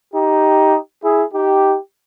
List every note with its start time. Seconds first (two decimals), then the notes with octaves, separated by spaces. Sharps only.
0.14 D#4 G4
1.04 E4 G#4
1.34 D#4 G4